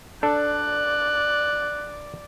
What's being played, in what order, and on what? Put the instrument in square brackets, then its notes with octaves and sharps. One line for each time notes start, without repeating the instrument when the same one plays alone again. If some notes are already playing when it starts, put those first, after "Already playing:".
[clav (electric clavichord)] D4 A4 [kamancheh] D5 [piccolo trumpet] F#6